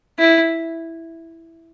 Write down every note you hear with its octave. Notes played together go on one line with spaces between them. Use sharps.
E4